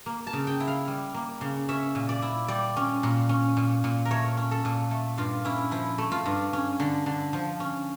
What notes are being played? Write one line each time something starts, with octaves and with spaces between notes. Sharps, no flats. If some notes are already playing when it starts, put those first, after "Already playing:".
A#3
A5
C#3
G5
E4
F5
G3
A#3
C#3
C#4 E5
A#2
D5
E4
G3 D5
C#4
A#2
C#4
A#2
A#2
A#4
A3 C#5
C#4
A4
A#2
A3
G2 F4
C#4 E4
F3 E4
A3
F4
G2
C#4
D3
D3
F3
C#4